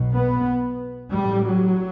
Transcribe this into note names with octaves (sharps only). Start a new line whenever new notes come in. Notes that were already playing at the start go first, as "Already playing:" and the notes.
Already playing: B1 B2
B3
A1 A2 G3
F#3